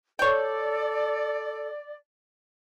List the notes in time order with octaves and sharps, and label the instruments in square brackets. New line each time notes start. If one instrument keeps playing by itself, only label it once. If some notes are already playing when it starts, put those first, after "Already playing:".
[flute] A4 [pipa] C#5 G5 [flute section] D5